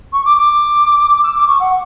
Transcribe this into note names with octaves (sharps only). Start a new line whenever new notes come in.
C#6
D6
D6
E6
D6
C#6
F#5